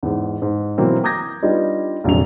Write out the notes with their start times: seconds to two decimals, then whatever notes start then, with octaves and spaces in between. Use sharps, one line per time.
0.03 E2 G#2
0.42 G#2
0.78 B2 E3 F#3 A#3 C4
1.03 A#5 D6 D#6 G6 G#6 A#6
1.43 G3 B3 D4 D#4 F4
2.04 F1 A#1 D3 F#3 C#4 F7